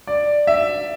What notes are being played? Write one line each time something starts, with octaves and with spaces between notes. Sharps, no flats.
D5
E5